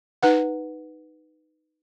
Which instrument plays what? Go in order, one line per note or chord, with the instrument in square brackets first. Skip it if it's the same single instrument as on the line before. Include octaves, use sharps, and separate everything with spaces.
[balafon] D#4 B4 F#5